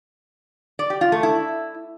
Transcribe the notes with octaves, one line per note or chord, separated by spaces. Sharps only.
D5
G4
F4
A3
E4